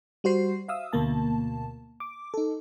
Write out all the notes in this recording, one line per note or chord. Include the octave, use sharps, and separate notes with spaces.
G3 F#4 C5 C7
E5 F5 D#6 E6
D2 B2 A#3 A5
D6
D#4 A4